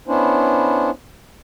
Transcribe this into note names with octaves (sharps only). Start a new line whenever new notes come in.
B3 C#4 D4 E4 C5